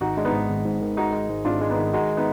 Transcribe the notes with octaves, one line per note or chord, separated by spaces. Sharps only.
G#1 D#4 F#4
G#3 D4
B3 D#4
G#2
G#1
G#2
D#3
G#3 D#4 F#4
G#3
G#2
G#1 D4 F4
G#3
B3 D#4
D#3
G#3 D#4 F#4
B3 D#4